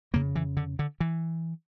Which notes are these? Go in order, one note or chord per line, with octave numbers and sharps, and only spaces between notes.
F2 C#3 A#3
E3
D3
D3
E3